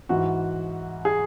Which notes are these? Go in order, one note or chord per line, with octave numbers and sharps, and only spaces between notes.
G#2 E3 F#4
G#4